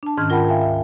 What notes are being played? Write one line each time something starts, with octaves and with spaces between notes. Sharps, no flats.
D4 A5
G#2 D#3 C#4 F6 G#6
F4 A#4 F#5 G5 A5 B5
E5 F5 G5 G#5
D2 E5